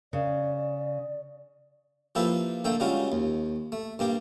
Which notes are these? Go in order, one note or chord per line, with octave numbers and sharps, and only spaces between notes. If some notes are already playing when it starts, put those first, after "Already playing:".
C#3 D5
F3 A#3 E4 G4 A4 B4
D3 A3 A#3 A4 G5
C#3 G3 G#3 F4 F#4
D#2
A3
G2 A#3 G4 D6